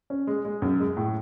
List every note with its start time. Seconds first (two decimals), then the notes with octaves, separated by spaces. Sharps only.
0.10 C#4
0.27 G#3
0.45 G#3
0.62 F#2
0.80 G#3
0.97 A2